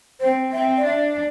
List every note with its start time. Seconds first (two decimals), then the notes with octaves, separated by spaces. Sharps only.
0.20 C4 C5
0.53 C4 E5
0.77 D5
0.85 D4 E5